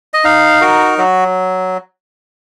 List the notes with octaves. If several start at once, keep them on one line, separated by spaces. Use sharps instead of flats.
D#5
D#4 F5
F#4 A#4
F#3 F#4